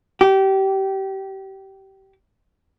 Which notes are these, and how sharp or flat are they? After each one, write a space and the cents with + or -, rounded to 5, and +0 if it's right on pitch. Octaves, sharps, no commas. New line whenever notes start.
G4 -25